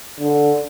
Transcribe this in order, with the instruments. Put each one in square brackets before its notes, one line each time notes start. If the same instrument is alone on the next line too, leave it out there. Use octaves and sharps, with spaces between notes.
[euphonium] D3